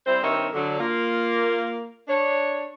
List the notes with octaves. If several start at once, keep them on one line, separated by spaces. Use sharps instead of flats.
G3 C4 E4 C5
G2 D#3 C4 C#5 D#5 E5
D3 F#3
A#3 F4
D4 C#5